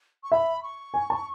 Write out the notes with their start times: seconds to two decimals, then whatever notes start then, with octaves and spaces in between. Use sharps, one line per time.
0.23 C#6
0.32 E5 B5
0.63 C#6
0.94 G#5
1.10 A5